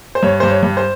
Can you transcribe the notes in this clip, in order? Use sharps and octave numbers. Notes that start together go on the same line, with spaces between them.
C5
G2 C#5
G2 C5
C#5
G2
C5